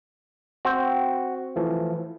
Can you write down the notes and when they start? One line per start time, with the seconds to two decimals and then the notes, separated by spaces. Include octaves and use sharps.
0.65 C4 F#4 G5
1.56 E3 F3 A3